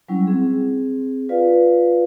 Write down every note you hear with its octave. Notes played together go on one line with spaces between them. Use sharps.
F#3 G3 C#4 E4
C4 G#4
F4 B4 D5 F5